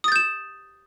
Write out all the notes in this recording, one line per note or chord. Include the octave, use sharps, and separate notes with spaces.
D#6 G6 A6 E7